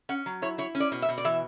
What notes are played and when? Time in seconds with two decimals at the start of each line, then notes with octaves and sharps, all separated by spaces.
0.09 C#4 F#5
0.26 F#3
0.42 E4 C#5
0.58 E4 C#5
0.75 C#4
0.80 D5
0.92 B2
1.02 E5
1.09 B2
1.18 D5
1.24 E3 E5